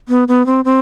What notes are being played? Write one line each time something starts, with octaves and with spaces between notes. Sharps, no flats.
B3
B3
C4
C4